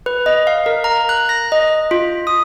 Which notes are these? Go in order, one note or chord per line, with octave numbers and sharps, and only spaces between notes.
B4
D#5
F5
A#4
A#5
F#6
A#6
D#5
F4
D#6